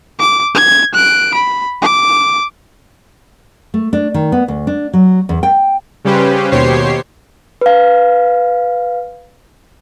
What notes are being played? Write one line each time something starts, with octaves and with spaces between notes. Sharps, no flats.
D6
G#6
F#6 D7
B5
D6
A3
D4
D#3
B3
D2
D4
F#3
E2
G5
C#3 G3 C#4 G4 B4 C5
D#2 B2 G4 C5 C#5 C7
B4 F5